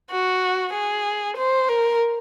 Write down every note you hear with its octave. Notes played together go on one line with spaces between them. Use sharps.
F#4
G#4
C5
A#4